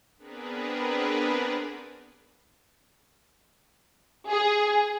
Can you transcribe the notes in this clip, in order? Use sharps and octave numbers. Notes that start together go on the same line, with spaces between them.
B3 C4 D4 G#4 A#4 B4
G#4